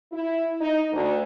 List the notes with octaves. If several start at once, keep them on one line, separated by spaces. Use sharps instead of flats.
E4
D#4
D2